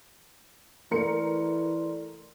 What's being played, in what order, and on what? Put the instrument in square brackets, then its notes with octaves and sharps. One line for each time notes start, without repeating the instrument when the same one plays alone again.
[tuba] E3 [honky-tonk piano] A3 A#4 C#7 [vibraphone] D5 C6